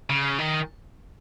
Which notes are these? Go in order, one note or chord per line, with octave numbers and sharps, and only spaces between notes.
C#3
D#3